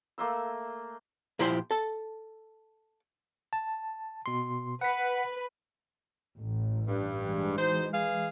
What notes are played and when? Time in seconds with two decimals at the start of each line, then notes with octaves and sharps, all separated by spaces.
0.18 A3 A#3 C6 E6
1.39 A#2 F3 E4 G4 C5 C6
1.71 A4 A5
3.53 A5
4.26 B2 C6
4.81 B4 F#5 B6
6.35 A1
6.88 G2
7.21 E3 G#3
7.58 D#4 F#4 C5
7.93 G#4 B4 F5